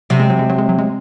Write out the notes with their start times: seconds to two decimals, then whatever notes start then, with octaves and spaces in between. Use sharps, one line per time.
0.10 C3 F#3
0.20 G#3
0.30 F#3
0.39 G#3
0.49 F#3
0.58 G#3
0.69 F#3
0.78 G#3